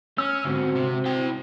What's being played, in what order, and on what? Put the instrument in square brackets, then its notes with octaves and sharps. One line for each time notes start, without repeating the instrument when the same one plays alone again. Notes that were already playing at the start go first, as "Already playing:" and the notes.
[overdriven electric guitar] C#4 [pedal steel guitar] E6 F6
[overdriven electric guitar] G#2 D3 [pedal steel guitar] C4 F#4
[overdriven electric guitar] C3
E4 G5